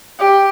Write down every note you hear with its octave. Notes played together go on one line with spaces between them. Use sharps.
G4